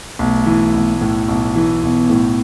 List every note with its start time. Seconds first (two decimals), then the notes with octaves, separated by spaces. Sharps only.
0.19 B1 A3
0.46 E3
0.74 B1
1.01 A2
1.29 B1
1.56 E3
1.83 B1 B3
2.10 A2